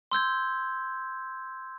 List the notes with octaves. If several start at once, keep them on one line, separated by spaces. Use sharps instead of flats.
C6 E6 G6 G#6